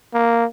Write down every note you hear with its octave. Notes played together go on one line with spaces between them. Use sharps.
A#3